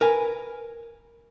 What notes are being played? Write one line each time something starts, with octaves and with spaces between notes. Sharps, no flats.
A#4 B4 G#5